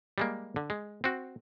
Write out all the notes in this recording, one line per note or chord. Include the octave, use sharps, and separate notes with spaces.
G3 G#3 A#3
D3
G#3
C4 F#4